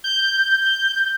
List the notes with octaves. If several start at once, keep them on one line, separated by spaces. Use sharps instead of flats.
G6